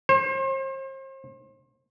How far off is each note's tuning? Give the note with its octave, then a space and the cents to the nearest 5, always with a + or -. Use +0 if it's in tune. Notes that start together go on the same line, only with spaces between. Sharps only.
C5 +40